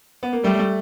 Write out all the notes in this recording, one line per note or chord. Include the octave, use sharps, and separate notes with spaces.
B3
A#3
G3 A3
A3